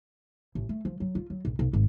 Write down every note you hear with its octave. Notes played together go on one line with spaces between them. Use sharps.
A1
A3
F3
F#3
F4
F#3
A#1
B1
G#1